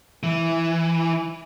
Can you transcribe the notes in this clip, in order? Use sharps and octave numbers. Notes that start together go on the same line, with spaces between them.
E3